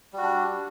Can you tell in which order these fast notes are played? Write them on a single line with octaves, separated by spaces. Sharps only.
G3 F#4 D4